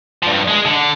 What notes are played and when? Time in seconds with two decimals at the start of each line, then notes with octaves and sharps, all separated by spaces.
0.23 G2 F3
0.48 G#3
0.65 D3